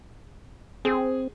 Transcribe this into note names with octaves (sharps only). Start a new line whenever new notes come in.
C4 G#4